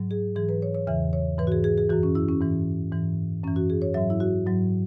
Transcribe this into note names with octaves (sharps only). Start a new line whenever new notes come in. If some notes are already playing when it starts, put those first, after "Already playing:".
Already playing: G#2 F#3
G#4
G#2 E3 G#4
B4
C#5
C#5
E2 C#3 E3 E5
C#5
G#2 E3 B4
F#4
G#4
G#4
G#4
F#2 E3 F#4
C#4
E4
C#4
G#2 E3
G#2 E3
F#2 E3 C#4
F#4
G#4
C#5
G#2 F#3 E5
E4
F#4
G#2 F#3